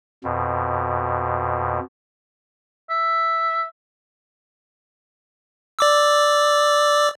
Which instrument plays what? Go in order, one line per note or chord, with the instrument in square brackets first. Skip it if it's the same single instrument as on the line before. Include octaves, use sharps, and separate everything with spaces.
[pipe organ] F2 B2
[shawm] E5
[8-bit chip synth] D5 D6 E6